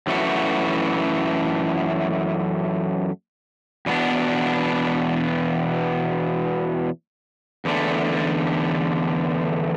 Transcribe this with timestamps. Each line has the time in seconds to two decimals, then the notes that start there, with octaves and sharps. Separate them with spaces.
0.07 F#2 E3 A3 F#4
3.86 E2 B2 B3 D4
7.65 E2 D3 A3